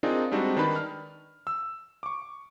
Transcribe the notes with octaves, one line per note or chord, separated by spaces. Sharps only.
C4 D4 D#4 F4 G#4 A#4
G3 G#3 C4 D4 D#4 F#4
D#3 D4 D#4 B4 A5 B5
F6
E6
C#6 D6